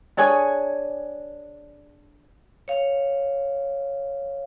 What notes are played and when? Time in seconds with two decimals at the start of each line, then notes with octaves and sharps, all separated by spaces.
0.17 D4 G#4 C#5 G#5
2.68 C#5 F5